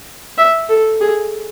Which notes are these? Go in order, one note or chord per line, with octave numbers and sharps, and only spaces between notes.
E5
A4
G#4